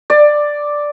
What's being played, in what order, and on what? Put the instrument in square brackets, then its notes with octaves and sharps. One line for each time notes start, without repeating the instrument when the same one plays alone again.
[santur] D5